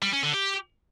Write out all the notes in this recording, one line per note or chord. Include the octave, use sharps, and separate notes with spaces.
G3
C#4
D3
G4